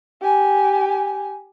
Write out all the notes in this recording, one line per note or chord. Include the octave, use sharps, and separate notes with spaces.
G4 G#5